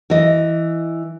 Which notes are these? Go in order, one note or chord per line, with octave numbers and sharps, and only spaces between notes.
E3 D#5